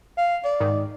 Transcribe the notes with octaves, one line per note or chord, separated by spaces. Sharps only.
F5
D5
G#2 D#3